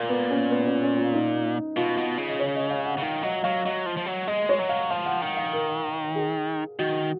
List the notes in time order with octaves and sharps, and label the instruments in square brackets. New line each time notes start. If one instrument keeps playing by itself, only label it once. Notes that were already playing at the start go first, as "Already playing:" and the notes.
Already playing: [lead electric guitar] A#2 [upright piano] A#3
[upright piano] B3
C#4
B3
C#4
C#4
F4
D#4
[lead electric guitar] B2 [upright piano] F4
[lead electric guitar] B2
C#3
[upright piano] D#5
C#5
D#5
F5
F#5
[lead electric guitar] C#3
[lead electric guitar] D#3 [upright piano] F5
[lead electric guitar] F#3 [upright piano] D#5
[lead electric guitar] F#3 [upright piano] F5
[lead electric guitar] F#3 [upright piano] D#5
[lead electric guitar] F3
F3
F#3
[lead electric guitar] G#3 [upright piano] D#5
[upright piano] C#5
[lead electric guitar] F#3
[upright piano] F5
[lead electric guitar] F3 [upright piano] F5
[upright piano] F#5
[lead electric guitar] D#3 [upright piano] F#5
[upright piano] F5
A#4
G#4
[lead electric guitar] D#3 [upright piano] F#4